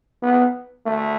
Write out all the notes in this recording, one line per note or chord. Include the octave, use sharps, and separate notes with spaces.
B3
A3